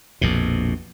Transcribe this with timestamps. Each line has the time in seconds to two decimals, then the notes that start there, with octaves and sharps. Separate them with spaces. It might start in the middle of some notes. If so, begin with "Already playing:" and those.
0.21 A#1 F2 B2